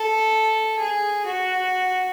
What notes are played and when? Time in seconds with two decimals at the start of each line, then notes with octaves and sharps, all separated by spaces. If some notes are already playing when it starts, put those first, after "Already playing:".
Already playing: A4
0.78 G#4
1.26 F#4